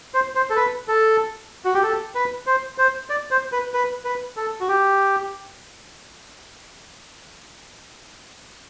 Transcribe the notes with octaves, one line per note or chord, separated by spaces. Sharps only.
C5
C5
A4
B4
A4
F#4
G4
A4
B4
C5
C5
D5
C5
B4
B4
B4
A4
F#4
G4